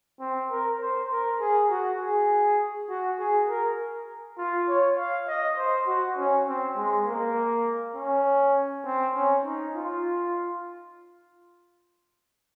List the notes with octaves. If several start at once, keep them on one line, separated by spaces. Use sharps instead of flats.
C4
A#4
C5
A#4
G#4
F#4
G#4
F#4
G#4
A#4
F4
C#5
F5
D#5
C5
F#4
C#4
C4
G#3
A#3
C#4
C4
C#4
D#4
F4